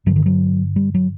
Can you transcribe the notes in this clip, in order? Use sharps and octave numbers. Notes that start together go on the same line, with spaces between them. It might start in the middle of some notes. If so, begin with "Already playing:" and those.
G2 D3 F#3
D#3
F#3
G3
F#3